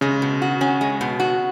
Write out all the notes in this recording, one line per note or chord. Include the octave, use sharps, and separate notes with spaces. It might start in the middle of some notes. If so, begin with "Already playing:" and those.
C#3 G#3
B2
F#4
C#4
G#3
B2
F#4